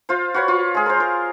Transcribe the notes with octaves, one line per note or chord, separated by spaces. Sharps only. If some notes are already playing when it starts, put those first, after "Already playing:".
F4 C5
F#4 B4 C#5
F4
G#3 G#4
A#4 C5
A#4